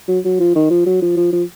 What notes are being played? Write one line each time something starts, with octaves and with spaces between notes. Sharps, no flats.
F#3
F#3
F3
D#3
F3
F#3
F3
F3
F3